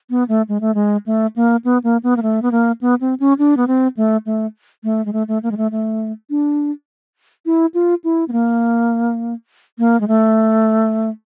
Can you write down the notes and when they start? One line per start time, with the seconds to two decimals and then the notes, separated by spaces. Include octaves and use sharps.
0.10 B3
0.29 A3
0.49 G#3
0.61 A3
0.75 G#3
1.06 A3
1.36 A#3
1.65 B3
1.84 A#3
2.03 B3
2.17 A#3
2.23 A3
2.42 B3
2.52 A#3
2.81 B3
3.01 C4
3.20 C#4
3.39 D4
3.57 B3
3.67 C4
3.97 A3
4.26 A3
4.84 A3
5.05 G#3
5.13 A3
5.28 A3
5.43 A#3
5.51 G#3
5.57 A3
5.71 A3
6.30 D4
7.46 E4
7.74 F4
8.04 E4
8.28 B3
8.32 A#3
9.79 A#3
10.01 G#3
10.08 A3